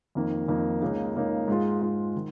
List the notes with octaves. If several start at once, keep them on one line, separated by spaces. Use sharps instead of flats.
F2 D#3 A#3 D#4
F2 D#3 A#3 D#4
C#2 C#3 A#3 D#4
C#2 C#3 A#3 D#4
G#2 G#3 F4
G#2 G#3 F4
D#3